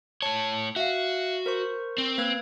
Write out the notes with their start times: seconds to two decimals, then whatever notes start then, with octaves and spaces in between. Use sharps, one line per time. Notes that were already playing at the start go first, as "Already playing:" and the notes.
0.22 A2 C#5 A5
0.76 F#4 E5 F5
1.46 A#4 C5 C#6
1.98 C4
2.18 A#3 B4 G#6